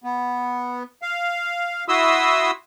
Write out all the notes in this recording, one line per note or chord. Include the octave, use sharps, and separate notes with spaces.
B3
F5
E4 F#4 E5 C6 D#6 E6